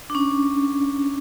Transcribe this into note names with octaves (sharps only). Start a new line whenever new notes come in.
D4
C#4